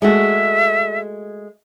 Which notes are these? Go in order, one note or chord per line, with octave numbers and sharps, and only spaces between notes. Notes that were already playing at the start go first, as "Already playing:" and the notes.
G#3 A3 F#4 E5